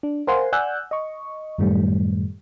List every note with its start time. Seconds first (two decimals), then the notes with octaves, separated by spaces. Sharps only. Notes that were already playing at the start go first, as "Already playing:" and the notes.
0.03 D4
0.27 A#4 C5 F5 F#5 G#5 C6
0.52 D5 F#5 G#5 E6 F#6 G6
0.91 D#5 C#6
1.58 F#2 A2 D#3 G3 A3